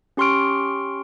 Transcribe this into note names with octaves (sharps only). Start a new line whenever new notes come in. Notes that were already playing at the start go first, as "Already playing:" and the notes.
C#4 G4 C6 C#6 F6 D7